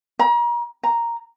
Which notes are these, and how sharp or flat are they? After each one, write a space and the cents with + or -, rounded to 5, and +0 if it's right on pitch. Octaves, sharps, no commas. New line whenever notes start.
A#5 +35
A#5 +0